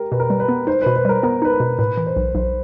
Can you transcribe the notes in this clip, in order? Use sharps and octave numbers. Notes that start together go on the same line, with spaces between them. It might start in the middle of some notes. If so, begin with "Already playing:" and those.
Already playing: G4 A#4
B2 B4
A#4
G3 B4
B4
B3
D#4 C5
B4
B2
B4
G3 A#4
B3 A#4
D#4 B4
A#4
B2
A2 B4
E3
C5
B1
B1 C5